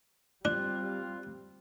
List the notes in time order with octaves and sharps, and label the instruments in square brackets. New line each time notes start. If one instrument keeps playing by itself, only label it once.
[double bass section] G3 C4 [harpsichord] D4 [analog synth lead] F4 [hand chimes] F#6